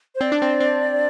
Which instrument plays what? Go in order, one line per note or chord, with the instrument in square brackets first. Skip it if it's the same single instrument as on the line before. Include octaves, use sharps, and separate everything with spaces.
[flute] C5
[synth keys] C4 [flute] D5
[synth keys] D4
C4
C4